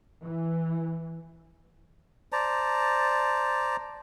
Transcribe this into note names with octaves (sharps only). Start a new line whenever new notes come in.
E3
C5 D5 A5 A#5